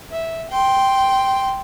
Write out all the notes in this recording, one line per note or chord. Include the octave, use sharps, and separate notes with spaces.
E5
G5 C6